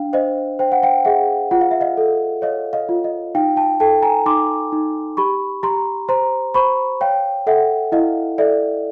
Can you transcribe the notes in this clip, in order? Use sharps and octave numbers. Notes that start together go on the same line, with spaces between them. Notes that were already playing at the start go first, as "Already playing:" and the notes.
Already playing: D4 F5 G5
C5 D#5 F5
C5 G5
F#5
F5 G5
G#4 E5 F#5
F4 F#5
F5
E5
D#5 F5
A4
C#5 D#5 F5
D#5 F5
F4
D#5
D#4 F5 G5
G5 A5
A4 G5 A5
G#5 A#5
D#4 C6 D6
D#4
G4 B5 C#6
G4 A#5 C6
C5 A#5 C6
C5 B5 C#6
C#5 F5 G5
A4 E5 F#5
E4 D#5 F5
A4 D5 E5